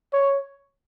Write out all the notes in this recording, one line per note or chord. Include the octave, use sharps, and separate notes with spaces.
C#5